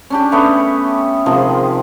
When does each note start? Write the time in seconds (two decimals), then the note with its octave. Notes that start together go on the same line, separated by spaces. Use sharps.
0.10 C#4 D4 G4
0.32 A3 B3 C#5 B5
1.26 C3 D#3 F3 G#3